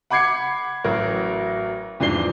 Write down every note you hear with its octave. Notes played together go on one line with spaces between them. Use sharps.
F#5 B5 D6 G#6 C7 C#7
A1 F#3 F#4 A#4 C#5
E2 G#2 F3 D4 C7 G7